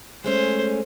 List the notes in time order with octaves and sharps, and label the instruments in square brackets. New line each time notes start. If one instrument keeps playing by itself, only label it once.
[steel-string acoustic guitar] G#3 A3 C#4 [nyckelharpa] C5